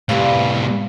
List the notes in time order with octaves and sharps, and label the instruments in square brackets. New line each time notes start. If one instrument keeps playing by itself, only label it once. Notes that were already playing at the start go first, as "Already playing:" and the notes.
[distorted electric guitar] A2 C3 [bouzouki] E3 G3 F5